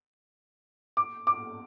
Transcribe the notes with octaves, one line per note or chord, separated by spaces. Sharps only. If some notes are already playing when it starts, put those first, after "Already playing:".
D6
D6